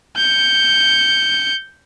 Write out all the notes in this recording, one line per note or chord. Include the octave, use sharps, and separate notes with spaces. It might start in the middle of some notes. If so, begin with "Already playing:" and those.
G6 C#7